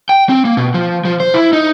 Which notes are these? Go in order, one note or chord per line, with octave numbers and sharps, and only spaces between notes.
G5
C4
A#3
B2
F3
F3
C5
E4
D#4